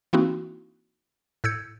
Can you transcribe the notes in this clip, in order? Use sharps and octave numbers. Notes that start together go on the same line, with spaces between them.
E3 A#3 C4 D#4 E4 F#4
A2 E6 G6 G#6 C#7